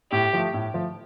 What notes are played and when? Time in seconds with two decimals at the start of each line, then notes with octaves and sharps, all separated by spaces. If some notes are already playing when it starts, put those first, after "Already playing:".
0.11 A2 G4
0.33 F3 A3
0.54 A2
0.74 F3 A3